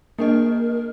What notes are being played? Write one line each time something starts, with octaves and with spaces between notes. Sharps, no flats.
A#3 D4 A#4 D#5